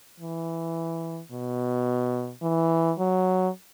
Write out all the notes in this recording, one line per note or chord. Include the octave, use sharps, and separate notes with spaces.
E3
B2
E3
F#3